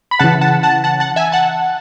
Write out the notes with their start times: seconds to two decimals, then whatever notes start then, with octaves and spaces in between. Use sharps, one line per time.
0.11 B5
0.19 C#3 E3 F#5 A5
0.41 F#5 A5
0.63 F#5 A5
0.84 F#5 A5
1.00 F#5 A5
1.16 E5 G#5
1.32 F#5 A5